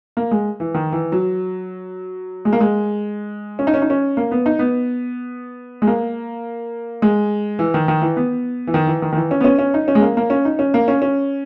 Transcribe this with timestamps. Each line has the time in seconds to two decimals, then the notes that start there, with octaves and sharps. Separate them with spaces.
0.17 A#3
0.31 G#3
0.60 E3
0.74 D#3
0.92 E3
1.12 F#3
2.45 G#3
2.53 A#3
2.61 G#3
3.59 C#4
3.67 D#4
3.74 C#4
3.82 D#4
3.90 C#4
4.17 A#3
4.31 B3
4.46 D#4
4.59 B3
5.82 G#3
5.87 A#3
7.02 G#3
7.59 E3
7.74 D#3
7.88 D#3
8.02 E3
8.17 B3
8.67 E3
8.74 D#3
8.87 E3
9.02 D#3
9.12 D#3
9.16 E3
9.31 C#4
9.40 B3
9.44 C#4
9.59 C#4
9.74 D#4
9.88 C#4
9.95 G#3
10.02 A#3
10.17 A#3
10.30 C#4
10.45 D#4
10.59 C#4
10.74 A#3
10.88 C#4
11.02 C#4